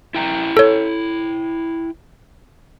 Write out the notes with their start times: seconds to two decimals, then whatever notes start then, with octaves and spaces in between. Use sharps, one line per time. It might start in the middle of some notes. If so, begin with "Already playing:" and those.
0.14 E4 G5 A#5
0.57 A4 C#5